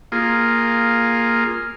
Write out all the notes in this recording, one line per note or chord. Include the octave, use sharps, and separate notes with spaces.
A#3 F4 G#4